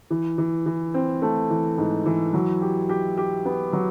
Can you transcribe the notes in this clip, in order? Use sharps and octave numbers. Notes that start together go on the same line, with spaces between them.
E3
E3
E3
C4
A3
E3
G#2
E3
F#3
G4
G4
G4
B3
F#3